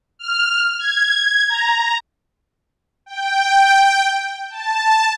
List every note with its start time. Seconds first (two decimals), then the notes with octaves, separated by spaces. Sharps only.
0.18 F6
0.78 G#6
1.48 A#5
3.06 G5
4.50 A5